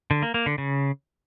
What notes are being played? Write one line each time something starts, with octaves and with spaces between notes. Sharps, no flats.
D3
A#3
A#3
D3
C#3